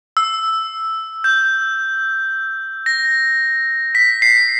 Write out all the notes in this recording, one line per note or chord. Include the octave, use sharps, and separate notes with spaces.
E6
G6
A#6
B6
C7